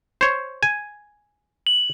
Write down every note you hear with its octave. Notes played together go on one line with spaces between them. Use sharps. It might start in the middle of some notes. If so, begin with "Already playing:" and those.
C5 C#5
G#5
F#7